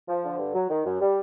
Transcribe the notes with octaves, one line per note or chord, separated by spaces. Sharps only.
F3
D3
G2
F#3
D#3
F#2
G3